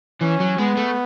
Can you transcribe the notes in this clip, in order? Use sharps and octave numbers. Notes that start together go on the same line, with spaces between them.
E3 C#4
F#3
G#3 B3
A3